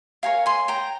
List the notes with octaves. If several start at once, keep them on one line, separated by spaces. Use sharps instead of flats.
G4 A#4 C#5 F5 G#5
G#5 C6
G5 A#5